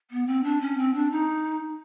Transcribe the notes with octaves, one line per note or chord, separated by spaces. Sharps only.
B3
C4
D4
C#4
C4
D4
D#4